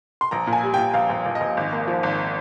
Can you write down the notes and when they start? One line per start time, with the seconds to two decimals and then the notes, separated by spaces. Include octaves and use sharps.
0.21 C6
0.31 A#1 A#5
0.47 A#2
0.53 G#5
0.63 G3
0.74 A#2 G5
0.94 A#1 F5
1.10 A#1
1.26 A#1
1.35 D#5
1.41 A#1
1.57 G#1
1.72 A#3
1.88 F3
2.03 G#1